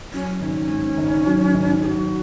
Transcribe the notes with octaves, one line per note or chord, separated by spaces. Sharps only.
F#3 C#4
G#1 C#4
G#2
G#1
F#3
G#1
F#3 F#4 G#4